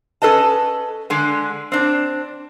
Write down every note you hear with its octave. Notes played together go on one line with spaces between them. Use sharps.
C#4 A4 B4 D#5 A5
D3 G#3
C4 D4